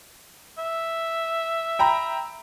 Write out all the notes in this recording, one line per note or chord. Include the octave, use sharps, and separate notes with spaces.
E5
G5 A#5 B5